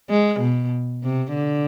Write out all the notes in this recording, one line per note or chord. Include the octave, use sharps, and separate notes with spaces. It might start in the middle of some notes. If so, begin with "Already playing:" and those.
G#3
B2
C3
D3